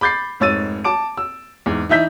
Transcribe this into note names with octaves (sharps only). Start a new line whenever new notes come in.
B5 D6 G6 A6 C7
F1 G#2 C#5 E6 A6 D#7
A5 D6 D7
E6
E2 G#2
E3 D#4 E5 G6 B6